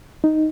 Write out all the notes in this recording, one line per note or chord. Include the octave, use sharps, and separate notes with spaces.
D#4